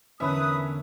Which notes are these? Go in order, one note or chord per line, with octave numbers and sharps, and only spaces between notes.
E2 D3 A#3 C#4 B4 E5 D#6